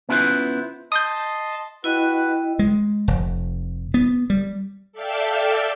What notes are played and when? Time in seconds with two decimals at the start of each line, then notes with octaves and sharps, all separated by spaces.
0.09 B3 C#4 E4 F4 B4 C5
0.92 D#5 A5 C6 D#6 G6
1.84 E4 F#4 B4 D#5 G5
2.59 G#3
3.08 F1
3.94 B3
4.30 G3
4.93 A4 D5 E5 F5 G5 A5